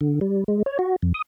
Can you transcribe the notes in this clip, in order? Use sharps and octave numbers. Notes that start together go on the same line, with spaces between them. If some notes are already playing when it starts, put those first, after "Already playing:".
D3
G3
G#3
C#5
F#4
F2
D#6